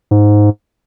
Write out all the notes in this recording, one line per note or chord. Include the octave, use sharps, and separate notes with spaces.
G#2